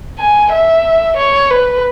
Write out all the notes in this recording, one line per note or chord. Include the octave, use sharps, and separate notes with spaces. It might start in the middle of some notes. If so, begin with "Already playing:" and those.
G#5
E5
C#5
B4